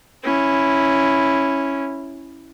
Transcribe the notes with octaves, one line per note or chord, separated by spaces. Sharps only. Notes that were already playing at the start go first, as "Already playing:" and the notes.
C#4 E4